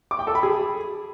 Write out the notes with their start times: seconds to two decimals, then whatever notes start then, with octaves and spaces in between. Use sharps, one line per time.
0.11 D6
0.19 G5
0.27 A4
0.35 B5
0.43 G#4